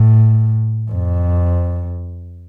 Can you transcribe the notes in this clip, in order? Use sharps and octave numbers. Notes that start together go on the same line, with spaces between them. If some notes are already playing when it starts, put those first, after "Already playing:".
Already playing: A2
F2